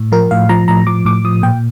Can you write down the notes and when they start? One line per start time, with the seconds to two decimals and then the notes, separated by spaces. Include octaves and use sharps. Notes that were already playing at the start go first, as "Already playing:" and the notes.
Already playing: A2
0.12 F3 A#4
0.31 A2 F5
0.49 F3 A#5
0.68 A2 A#5
0.87 F3 D6
1.05 A2 D6
1.25 F3 D#6
1.43 A#2 G5